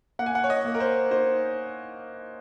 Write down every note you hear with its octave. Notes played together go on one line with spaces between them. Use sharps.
A#3 F#5
G#5
F#5
C#5
D#5
A#3
A#4
C5
D#4 C5